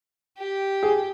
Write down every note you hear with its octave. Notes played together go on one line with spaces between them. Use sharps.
G4
G#4